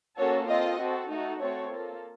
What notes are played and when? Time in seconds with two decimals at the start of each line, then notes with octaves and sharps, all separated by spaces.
0.17 A#3 C#4 F#4 A4 C#5
0.48 C4 F4 A4 D#5
0.79 C4 F#4 A4
1.10 A3 D#4 F#4 A4
1.40 A3 C4 F#4 A4 C#5
1.72 A#3 F4 A4